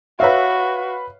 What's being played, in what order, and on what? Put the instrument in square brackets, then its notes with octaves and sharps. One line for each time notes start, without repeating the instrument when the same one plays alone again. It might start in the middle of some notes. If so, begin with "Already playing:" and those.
[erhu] F#4 [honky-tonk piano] B4 F5 [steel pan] C#5 E5